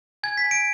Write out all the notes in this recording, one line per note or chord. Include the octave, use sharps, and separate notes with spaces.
G#5 G#6
B6
G#5
D7